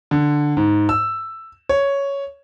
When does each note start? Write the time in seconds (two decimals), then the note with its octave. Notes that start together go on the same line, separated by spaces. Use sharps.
0.11 D3
0.57 G#2
0.89 E6
1.69 C#5